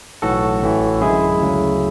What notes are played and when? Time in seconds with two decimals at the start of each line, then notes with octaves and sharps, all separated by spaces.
0.22 B1 A2 E3 F#4 A4
0.62 A1 A2 E3
1.01 F#2 D3 G#3 E4 G#4
1.41 D2 C#3 F#3